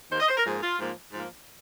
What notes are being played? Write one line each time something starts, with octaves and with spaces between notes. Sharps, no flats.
D#2 D#3 A#3 C5
D#5
C5
A#4
G#2 F3 A#3 G#4
F4
G#2 F3 A#3
G#2 F3 A#3